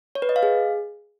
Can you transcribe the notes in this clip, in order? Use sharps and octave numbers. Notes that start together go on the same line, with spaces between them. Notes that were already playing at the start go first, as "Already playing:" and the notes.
C#5
B4
D#5
F5
G#4